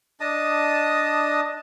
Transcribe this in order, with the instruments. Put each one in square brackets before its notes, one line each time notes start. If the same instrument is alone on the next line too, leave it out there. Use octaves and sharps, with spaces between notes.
[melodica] D4 D#5 A5 D#6